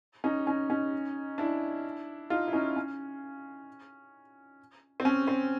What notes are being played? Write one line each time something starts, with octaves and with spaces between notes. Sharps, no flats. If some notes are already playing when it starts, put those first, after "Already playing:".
C#4 D#4
C#4 D#4
C#4 D#4
D4 E4
D#4 F4
E4
C#4 D#4
C#4
C4
C#4
C4